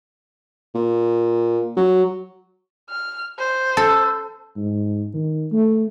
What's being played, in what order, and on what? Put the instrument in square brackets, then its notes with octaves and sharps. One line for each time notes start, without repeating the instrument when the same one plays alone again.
[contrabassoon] A#2
F#3
[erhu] F6
C5
[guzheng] A4
[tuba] G#2
D#3
A3